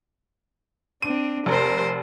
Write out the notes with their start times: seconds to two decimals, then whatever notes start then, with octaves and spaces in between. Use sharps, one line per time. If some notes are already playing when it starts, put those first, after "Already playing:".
1.02 C4 D4 D#7
1.46 F1 A#4 C5